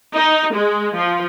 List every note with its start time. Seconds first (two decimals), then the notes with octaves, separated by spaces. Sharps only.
0.15 D#4
0.54 G#3
0.97 F3